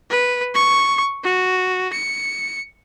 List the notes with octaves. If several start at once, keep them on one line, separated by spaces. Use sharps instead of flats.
B4
C#6
F#4
C#7